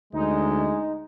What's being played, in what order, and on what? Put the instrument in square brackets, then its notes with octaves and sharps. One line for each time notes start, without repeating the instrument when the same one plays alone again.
[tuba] D2 [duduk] G#3 [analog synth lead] D#4